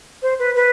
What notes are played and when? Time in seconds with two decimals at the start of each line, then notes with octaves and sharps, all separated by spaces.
0.22 C5
0.39 B4
0.55 B4